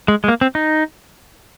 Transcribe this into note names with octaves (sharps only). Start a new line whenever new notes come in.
G#3
G#3
A#3
C4
D#4